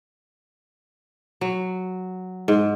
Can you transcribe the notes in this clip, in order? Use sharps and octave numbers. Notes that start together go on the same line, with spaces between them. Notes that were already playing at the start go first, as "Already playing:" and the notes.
F#3
G#2